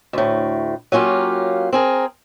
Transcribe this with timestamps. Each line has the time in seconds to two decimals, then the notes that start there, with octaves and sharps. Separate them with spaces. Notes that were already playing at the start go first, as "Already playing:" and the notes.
0.13 D2 A2
0.92 F#3 A#3 C#4 F4 G4
1.73 C4 G#4 A#4